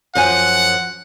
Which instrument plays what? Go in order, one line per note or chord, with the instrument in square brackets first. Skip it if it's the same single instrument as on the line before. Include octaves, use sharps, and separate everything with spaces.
[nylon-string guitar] F#2 F3 G#5 [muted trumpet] F#5